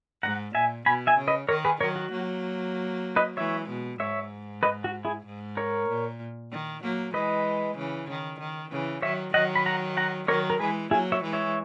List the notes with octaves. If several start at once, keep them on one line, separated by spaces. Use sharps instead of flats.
G#2 F#5 A#5
A#2 E5 G#5
B2 G#5 B5
E5 G#5
C#3
B4 D#5
D#3 A#4 C#5
G#4 B4
D#3 F#3 A#4 C#5
F#4
F#3 A#3
B4 D#5
E3 G#3 C#5 E5
B2
G#2 C#5 E5
B4 D#5
F#4
E4 G#4
G#2
A#4 C#5
A#2
D#3
F#3 A#3
E3 G#3 B4 D#5
C#3 E3
D#3
D#3
C#3 E3
D#3 F#3 C#5 E5
D#3 F#3 D#5 F#5
B5
F#5 A#5
F#5 A#5
D#3 F#3 A#4 C#5
A#4
E3 G#3 G#4 B4
F#3 A#3 E4 G#4
C#5 E5
E3 G#3
C#5 E5